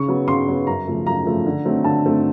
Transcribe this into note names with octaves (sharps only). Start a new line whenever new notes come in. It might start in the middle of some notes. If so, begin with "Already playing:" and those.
Already playing: C#3 C#6
F#3 B3
C#3 C6
F#3 B3
F#2 A#5
C#3 F3 A3
F#2 A#5
C#3 F3 A3
D3
F#3 A3 C4
D3 A5
F#3 A3 C4